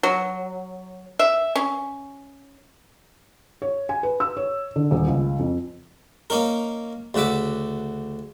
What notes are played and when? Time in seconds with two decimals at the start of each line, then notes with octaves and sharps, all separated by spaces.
0.03 F#3
1.19 E5
1.56 C#4
3.62 C#5
3.89 G#5
4.03 B4
4.20 E6
4.37 C#5
4.76 D3
4.91 D#1
5.07 C#2
5.39 F2
6.30 A#3 C#4 D#4 A#4
7.14 D2 C#3 F#4 E5 D6